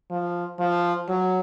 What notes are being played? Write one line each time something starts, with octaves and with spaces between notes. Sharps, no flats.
F3
F3
F#3